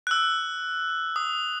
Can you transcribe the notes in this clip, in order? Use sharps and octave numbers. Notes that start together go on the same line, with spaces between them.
F#6
E6
D#6